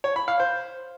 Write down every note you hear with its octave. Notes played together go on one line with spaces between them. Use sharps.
C#5
B5
F5
C5